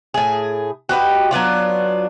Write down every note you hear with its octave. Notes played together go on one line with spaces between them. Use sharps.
A2 G#4
F#4 G4 B4 D#5
F#3 B3 D4 F4